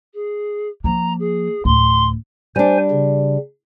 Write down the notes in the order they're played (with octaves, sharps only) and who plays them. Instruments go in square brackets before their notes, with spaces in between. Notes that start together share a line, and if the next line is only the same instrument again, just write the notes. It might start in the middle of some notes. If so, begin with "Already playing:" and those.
[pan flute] G#4
[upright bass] F3 A#3 [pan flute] A#5
[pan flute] G#4
[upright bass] D2 A2 [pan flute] C6
[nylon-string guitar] G3 D4 [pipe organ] C5 G#5
[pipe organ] C#3